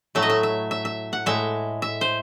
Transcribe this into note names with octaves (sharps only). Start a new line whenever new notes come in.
A2 F#3 A3 E5
D#5
E5
E5
E5
E5
F#5
A2 G#3 E5
E5
C5